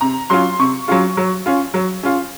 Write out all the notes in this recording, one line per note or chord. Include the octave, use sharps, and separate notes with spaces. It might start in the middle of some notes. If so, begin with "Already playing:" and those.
C3 A#5
F#3 C#4 F4 C6
C3 C#6
F#3 C#4 F4
F#3
C#4 F4
F#3
C#4 F4